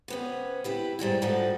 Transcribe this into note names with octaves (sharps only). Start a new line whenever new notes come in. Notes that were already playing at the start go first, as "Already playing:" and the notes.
C3 B3 C#4
E4 G4 B4
G#2 G3 G#3 E4
G#2 F3 G3 D4 F#4 A4